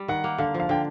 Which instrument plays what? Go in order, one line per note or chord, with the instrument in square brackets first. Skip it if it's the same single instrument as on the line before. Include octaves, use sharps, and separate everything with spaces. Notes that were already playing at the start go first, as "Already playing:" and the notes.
Already playing: [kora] G3
[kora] D#3 [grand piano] F#5
[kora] A#3
[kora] D3 [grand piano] F5
[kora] F3
[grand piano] F5
[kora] D3 [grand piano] G5